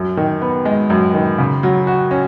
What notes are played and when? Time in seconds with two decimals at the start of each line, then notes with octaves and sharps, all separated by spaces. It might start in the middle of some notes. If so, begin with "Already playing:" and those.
Already playing: F#2
0.17 D#3
0.42 B3
0.65 G#3
0.90 F#2
1.14 D#3
1.38 C#3
1.63 F#3
1.87 F#4
2.11 C#4